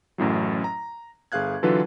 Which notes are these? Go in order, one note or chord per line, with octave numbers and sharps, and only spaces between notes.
A1 F#2 A2 F#3
A#5
G1 G#4 F5 F#6 G#6
D3 E3 F#3 F4 A4 B4